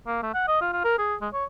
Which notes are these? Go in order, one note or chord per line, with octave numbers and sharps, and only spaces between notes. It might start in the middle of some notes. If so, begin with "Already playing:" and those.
A#3
A3
F#5
D#5
F4
F4
A#4
G#4
G#3
C#5